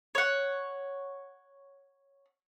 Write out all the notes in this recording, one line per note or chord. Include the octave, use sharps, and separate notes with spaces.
C#5 F#5